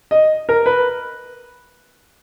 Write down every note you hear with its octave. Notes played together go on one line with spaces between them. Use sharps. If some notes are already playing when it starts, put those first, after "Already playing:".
D#5
A#4
B4